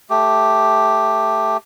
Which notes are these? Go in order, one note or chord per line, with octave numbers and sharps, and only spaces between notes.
A3 G4